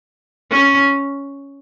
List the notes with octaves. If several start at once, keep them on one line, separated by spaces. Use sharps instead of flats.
C#4